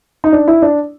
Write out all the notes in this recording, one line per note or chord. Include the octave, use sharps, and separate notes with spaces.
D#4
D4
E4
D4